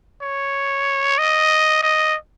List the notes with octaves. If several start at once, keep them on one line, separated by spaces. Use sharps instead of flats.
C#5
D#5
D#5